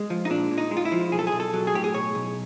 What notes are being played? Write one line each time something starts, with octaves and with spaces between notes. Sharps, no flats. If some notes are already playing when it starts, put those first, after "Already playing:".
Already playing: G#3
F3
D#4
A#2 D4
A#2
D#4
G#3
F4
E4
F3
B1 G#4
A4
G#4
B1
A4
F#3
G#4
A2 G4
G#4
B1 C#5
B1